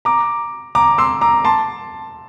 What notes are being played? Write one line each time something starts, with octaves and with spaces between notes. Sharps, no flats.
A#5 D6
A#5 D6
C6 E6
A#5 D6
A5 C6